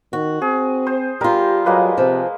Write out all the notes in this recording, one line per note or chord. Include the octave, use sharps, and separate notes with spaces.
D#3 F#4
C4 G#4
C5
G3 F4 G4 A#4
F#3 G#3 A#3 B4
C3 F3